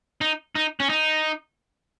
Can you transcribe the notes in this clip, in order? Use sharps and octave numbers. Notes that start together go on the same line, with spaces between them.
D#4
D#4
C#4
D#4